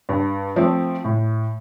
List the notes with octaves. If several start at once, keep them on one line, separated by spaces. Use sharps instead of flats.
G2
F3 A3 C4
A2